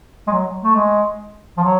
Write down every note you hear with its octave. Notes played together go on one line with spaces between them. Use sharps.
G#3
F#3
A3
G#3
F3
F#3